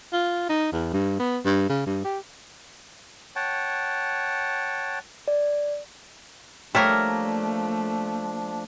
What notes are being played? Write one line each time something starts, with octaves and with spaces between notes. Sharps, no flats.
F4
D#4
E2
G2
B3
G2
C#3
G2
G4
C#5 F#5 G5 A5
D5
F3 G3 A3 A#3 D4 A#4 C#5 E5